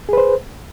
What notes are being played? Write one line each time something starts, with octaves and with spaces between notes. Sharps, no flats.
G#4 B4 C5